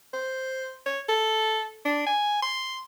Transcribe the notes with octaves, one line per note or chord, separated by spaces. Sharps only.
C5
C#5
A4
D4
G#5
C6